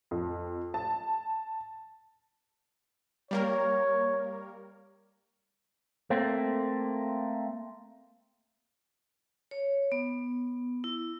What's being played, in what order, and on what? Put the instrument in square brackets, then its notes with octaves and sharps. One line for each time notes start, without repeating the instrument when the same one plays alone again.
[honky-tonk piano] F2
A5
[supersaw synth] G3 A#3 A#4 [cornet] C#5
[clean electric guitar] A3 A#3 C4
[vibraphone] C#5
B3
E4